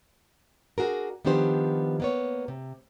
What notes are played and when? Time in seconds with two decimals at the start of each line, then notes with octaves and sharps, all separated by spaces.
0.78 D4 F#4 G#4 A#4
1.25 D#3 F3 B3 D4 G4 C5
2.00 A#3 B3 C#5
2.48 C3